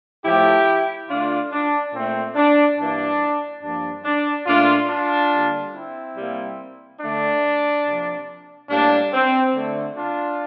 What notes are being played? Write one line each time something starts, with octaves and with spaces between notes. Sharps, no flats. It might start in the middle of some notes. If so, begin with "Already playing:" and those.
A2 F3 A3 E4 G4
D3 A3 D4 F4
D4
A#2 A3 C4
D4
G2 E3 A#3 D4
G2 F3 A#3 D4
D4
A#2 A3 D4 F4
D4 F4
D3 G3 A#3
C4 E4
C3 G3 A#3
D3 A3 D4
C3 F3 A#3
A2 G3 A#3 D4
C4
D3 A3
D4 F4